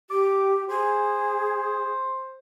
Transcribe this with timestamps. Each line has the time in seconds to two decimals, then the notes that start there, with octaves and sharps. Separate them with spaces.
0.10 G4 D6
0.69 G#4 C5